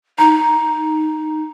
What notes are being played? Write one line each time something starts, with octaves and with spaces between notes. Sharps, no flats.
D#4 A#5